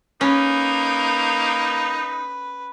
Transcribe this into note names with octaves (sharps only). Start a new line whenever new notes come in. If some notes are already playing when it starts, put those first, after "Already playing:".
A#3 C#4 D#4 B4